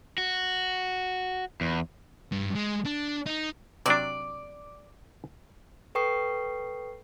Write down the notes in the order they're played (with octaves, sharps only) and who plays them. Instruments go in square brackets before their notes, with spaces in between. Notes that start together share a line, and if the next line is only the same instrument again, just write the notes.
[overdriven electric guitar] F#4
E2
[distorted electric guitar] G2
G#3
D4
D#4
[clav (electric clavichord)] C3 F#3 D4 [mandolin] D5
[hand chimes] A4 B4 G5 C#6 D#6 C7